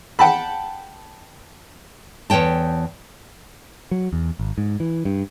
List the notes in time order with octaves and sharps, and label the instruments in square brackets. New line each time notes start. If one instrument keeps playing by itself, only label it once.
[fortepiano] F#5 G5 A5 B5
[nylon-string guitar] E2 E3 C#5 G5 A5
[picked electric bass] F#3
E2
G#1
G#2
E3
G2